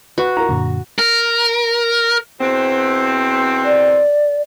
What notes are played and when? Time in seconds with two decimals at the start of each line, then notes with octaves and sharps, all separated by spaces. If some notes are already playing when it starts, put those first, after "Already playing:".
0.18 F#4 B4
0.37 E4 F4 A#4 A#5
0.49 F#2 A#2 D3
0.99 A#4
2.40 E2 B2 C4
3.65 D5